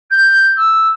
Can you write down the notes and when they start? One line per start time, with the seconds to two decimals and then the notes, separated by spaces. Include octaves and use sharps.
0.11 G6
0.56 E6